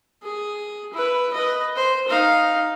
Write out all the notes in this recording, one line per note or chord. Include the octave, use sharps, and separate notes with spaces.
G#4
E4 B4
B4 D#5
C5
D#4 F5